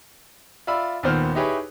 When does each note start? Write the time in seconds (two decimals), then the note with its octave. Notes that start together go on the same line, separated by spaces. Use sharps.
0.67 F4 D5 E5 B5 E6
1.03 D#2 A#2 D#3 B3 C5 F6
1.35 D#4 E4 G4 G#4 B4 C#5